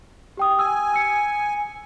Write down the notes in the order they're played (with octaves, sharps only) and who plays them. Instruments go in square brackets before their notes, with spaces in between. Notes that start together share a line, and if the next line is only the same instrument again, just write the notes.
[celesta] G4 G5 D#6
[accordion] G#5 [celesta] E6
[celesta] E6 C#7